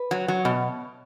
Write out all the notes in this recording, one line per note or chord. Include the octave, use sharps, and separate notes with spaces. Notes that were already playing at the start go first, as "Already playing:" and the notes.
Already playing: B4
F#3
F#3
B2